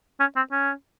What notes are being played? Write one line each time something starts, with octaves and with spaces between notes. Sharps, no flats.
C#4
C4
C#4